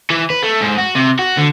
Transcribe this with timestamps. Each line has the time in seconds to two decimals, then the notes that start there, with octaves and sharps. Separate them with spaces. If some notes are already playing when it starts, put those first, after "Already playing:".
0.10 E3
0.30 B4
0.43 A3
0.61 G#2
0.78 F#4
0.96 C3
1.19 F#4
1.37 D3